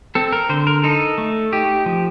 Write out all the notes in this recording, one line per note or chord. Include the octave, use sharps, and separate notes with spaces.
C4 A4
A#4
D3 C5
A#4
D#4 A4
A3
D#4 G4
F3